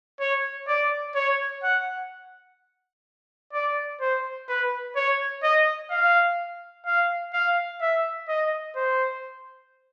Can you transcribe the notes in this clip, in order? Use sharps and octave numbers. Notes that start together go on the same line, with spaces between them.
C#5
D5
C#5
F#5
D5
C5
B4
C#5
D#5
F5
F5
F5
E5
D#5
C5